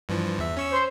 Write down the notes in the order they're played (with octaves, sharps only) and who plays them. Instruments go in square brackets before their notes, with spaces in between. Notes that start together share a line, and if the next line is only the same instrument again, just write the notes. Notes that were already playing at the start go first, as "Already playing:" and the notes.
[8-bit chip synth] G2 E3 F3
E2 E5
C#4 C#6 E6
[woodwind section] C5